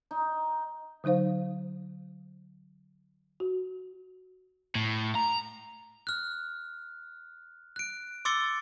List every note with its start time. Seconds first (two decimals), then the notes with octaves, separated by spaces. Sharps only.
0.11 D#4
1.04 D3 F#3 D#4 C5 F5
3.40 F#4
4.75 A2
5.15 A#5
6.07 F6 F#6
7.76 F#6 D7
8.25 C6 D6 E6 A6 C#7 G7